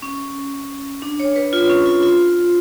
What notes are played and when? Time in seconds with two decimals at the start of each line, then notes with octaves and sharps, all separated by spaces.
0.02 C#4
1.02 D4
1.20 C#5
1.36 B4
1.53 F4
1.69 C#4
1.86 F4
2.03 F4